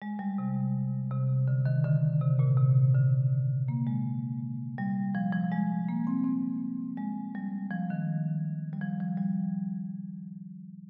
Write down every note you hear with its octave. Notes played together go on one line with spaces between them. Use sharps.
G#3
G3
C3
C3
D3
D#3
D3
C3
A#2
C3
D3
A#3
G#3
G3
F3
F3
G#3
A#3
C4
C4
G#3
G3
F3
D#3
G3
F3
F3
G3